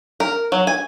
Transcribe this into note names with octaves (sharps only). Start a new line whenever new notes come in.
A#4
F#3
G#5